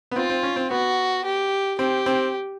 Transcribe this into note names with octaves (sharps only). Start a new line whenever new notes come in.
B3
C4 F4
C4
C#4
C4
B3 F#4
G4
C4 G4
C4